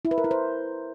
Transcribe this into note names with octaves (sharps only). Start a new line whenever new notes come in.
E4
B4
A#4
E4
C5